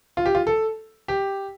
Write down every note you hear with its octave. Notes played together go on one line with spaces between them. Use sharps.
F4
G4
F4
A4
G4